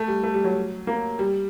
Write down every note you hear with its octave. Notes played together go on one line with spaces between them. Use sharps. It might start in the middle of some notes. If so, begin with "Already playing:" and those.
Already playing: A3
G3
A3
G3
F#3
A#3
G3